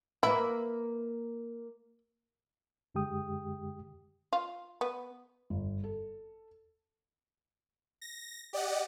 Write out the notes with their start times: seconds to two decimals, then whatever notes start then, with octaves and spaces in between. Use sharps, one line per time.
0.23 A#3 E4 B4 E5
2.94 F#2 D3 G#3 G4 G5 D#6
4.33 F4
4.81 B3
5.50 G1
5.84 A4
8.02 A#6
8.53 G4 D5 D#5 F#5